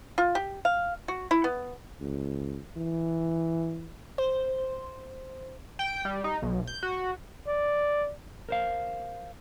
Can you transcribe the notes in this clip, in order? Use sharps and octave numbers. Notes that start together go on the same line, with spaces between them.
F4
G4
F5
F#4
E4
B3
C#2
E3
C5
G5
G3
D#4
B1
G6
F#4
D5
A#4 C5 F5